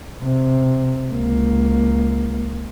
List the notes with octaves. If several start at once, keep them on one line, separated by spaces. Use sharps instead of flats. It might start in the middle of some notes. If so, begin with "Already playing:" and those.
C3
C#2 A#3